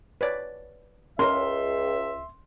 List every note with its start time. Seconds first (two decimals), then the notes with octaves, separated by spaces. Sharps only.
0.21 B4 C#5 D5
1.19 C#2 C#4 A#4 E5 C6